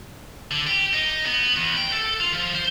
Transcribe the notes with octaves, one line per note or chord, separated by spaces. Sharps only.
D3
G4
D#4
B3
E2
G5
A4
F4
F3
C5